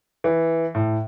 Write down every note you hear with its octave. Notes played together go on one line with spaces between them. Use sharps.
E3
A2